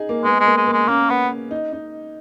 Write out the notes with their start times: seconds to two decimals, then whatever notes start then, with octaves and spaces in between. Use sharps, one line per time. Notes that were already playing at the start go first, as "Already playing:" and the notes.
Already playing: D#4 G#4
0.09 A#3
0.24 G#3 B3
0.40 G#3
0.46 A#3
0.57 G#3
0.67 A#3
0.73 G#3
0.88 A#3 C#4
1.10 B3
1.51 D#4
1.73 D#4